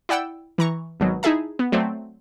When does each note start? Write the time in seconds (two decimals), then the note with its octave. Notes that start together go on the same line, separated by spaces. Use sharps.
0.09 E4 D5 F#5 G5 E6
0.58 E3 A#5 C#6
1.00 G#1 B2 F#3
1.23 D#4 E4 G#4 E5 A5
1.59 B3
1.72 F#3 A3 C4 D5